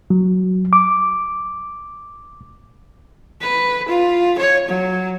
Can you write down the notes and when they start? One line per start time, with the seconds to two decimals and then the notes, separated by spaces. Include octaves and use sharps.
0.10 F#3
0.73 D6
3.41 B4
3.89 F4
4.39 C#5
4.68 F#3